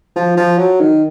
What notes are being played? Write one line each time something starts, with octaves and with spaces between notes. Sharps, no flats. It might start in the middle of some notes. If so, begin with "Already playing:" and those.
F3
F3
F#3
D#3